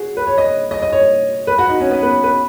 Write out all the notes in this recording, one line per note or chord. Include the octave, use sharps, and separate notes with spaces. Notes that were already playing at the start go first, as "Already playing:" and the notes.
Already playing: F#4 G#4
B4
C#5
D#5
D#5
D#5
C#5
B4
F#4
D#4
C#4
B3
B4
B4